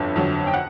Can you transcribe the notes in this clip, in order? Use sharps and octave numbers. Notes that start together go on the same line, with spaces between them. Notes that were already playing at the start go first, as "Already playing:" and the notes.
Already playing: G1 F2 D3 F#3
F2 D3 F#3
G5
F#5